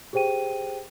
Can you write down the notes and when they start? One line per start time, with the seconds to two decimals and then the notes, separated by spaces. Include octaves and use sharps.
0.13 G4 G#4 C5 G5 D#7